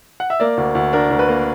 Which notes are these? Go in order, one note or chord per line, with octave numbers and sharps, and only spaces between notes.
F#5
E5
A#3 D5
D2
D2
D4 A#4
D2
B4
A#3